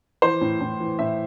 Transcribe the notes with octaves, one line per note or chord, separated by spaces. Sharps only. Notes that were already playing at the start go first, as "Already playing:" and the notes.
E3 C5
A2
A2
E3
A2 E5